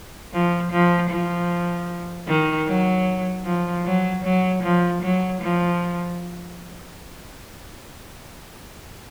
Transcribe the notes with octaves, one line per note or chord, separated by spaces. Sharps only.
F3
F3
F3
D#3
F#3
F3
F#3
F#3
F3
F#3
F3